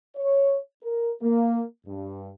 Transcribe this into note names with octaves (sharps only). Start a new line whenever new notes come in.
C#5
A#4
A#3
G2